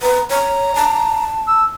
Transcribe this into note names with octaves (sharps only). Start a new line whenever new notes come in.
B4 A#5
C#5 A#5
A5
E6